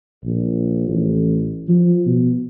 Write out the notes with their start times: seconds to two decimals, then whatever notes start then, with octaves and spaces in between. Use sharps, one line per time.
0.24 A#1
0.89 A1
1.68 F3
2.06 B2